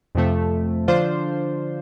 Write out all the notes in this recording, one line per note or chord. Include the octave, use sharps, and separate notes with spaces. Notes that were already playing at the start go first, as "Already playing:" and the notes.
F2 C3 F3 A3
D3 F3 D4 F4 C5